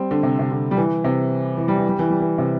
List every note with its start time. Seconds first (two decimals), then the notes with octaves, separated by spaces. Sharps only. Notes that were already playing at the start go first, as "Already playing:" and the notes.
Already playing: G3 C4
0.11 D3
0.23 C3
0.39 C3
0.51 D3
0.71 G3
0.77 E3
1.04 C3
1.57 E3
1.68 G3
1.78 E3
1.89 G3
1.99 E3
2.10 G3
2.20 E3
2.38 C3